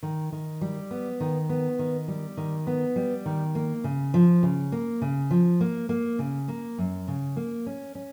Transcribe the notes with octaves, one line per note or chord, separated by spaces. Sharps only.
D#3
D#3
G3
B3
D#3
B3
D#3
G3
D#3
B3
G3
D#3
A#3
C#3
F3
C#3
A#3
C#3
F3
A#3
A#3
C#3
A#3
F#2
C#3
A#3
C#4
C#4